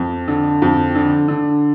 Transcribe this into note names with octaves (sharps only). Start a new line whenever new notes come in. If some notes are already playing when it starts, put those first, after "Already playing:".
Already playing: F2
D3
F2
D3
D3